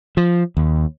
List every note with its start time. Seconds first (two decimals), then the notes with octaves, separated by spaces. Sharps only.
0.17 F3
0.57 D#2